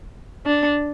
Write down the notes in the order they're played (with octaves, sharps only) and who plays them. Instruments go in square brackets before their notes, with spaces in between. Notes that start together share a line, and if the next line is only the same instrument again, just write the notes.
[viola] D4